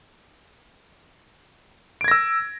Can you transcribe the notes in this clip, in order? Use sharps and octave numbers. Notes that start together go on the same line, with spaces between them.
E6 G#6 A#6 D7